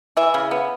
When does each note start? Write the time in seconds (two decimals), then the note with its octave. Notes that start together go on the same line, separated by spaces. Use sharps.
0.17 E3 E5
0.34 C#3
0.51 B3